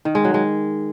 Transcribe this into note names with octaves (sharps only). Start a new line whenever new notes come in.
D#3
G#3
F#3
G#3